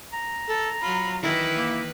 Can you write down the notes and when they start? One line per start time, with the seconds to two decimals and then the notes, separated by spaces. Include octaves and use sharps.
0.13 A#5
0.48 A4
0.81 F#3 F4 B5
1.22 D#3 E3 E4 B4
1.56 A#3